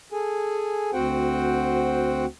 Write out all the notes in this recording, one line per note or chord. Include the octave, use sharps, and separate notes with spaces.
G#4 A4 G#5
D2 C4 F#4 C5 F#5 G5